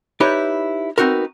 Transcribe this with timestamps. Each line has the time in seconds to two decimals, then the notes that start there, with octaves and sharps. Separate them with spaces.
0.20 D#4 E4 G4 B4 C#5 D5
0.98 B3 C4 D#4 F#4 A#4